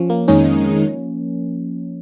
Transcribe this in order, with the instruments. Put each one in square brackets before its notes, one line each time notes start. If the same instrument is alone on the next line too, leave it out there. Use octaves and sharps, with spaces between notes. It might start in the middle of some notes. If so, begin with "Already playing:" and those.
Already playing: [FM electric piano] F3 C#4
A#3
[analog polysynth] F2 D#3 G#3 D#4 [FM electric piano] C#4